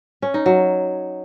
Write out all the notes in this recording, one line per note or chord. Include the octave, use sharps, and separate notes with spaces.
C#4
D#4
F#3